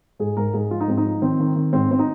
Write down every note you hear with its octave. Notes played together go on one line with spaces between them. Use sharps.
G#2 G#4
G#2 A#4
G#2 G#4
F3 F4
D#4
G#2 C4
D#4
F3
D#3 C4
D#3
D#3
G#2 C4
C4
D#4